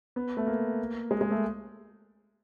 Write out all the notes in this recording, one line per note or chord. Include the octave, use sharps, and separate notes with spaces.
B3
A3
A#3
G#3
G#3
A3